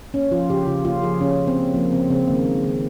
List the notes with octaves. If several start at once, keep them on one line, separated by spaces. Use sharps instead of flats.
A#3 C#4
F3 F4
C#3 G4
C#3 F4
A#3 F4
F3 G#4
C#3 C#4
C#3
C4
A#3
F3 A#3
C#3 C4
C#3 C4
D#3 A#3
G#3
D#3